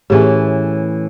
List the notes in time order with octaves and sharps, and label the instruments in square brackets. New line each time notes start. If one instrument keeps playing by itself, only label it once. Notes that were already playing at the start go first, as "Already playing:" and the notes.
[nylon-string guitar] A2 E3 C#4 [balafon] G4 G#4 B4